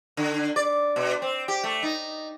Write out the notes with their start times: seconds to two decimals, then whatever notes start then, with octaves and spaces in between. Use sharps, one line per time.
0.17 D3
0.56 D5
0.96 B2
1.22 C4
1.48 G4
1.64 A3
1.83 D#4